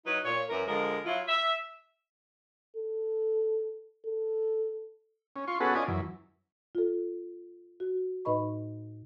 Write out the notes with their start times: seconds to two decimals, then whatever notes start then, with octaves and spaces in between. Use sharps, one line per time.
0.06 F#3 D#4 E4 B4
0.25 A#2 C#5
0.49 F#2 E3 A#4
0.67 D3 F3 G#3 A#4
1.05 F#3 E4 F4
1.28 E5
2.77 A4
4.06 A4
5.36 C#4
5.48 F4 C6 C#6
5.60 B3 C#4 F#4 G#4 A4 B4
5.75 C#4 F4 D5 D#5 G#5
5.88 F#2 E3
6.75 F4 A4
7.80 F#4
8.25 A2 D#4 B4 D#5 B5 C#6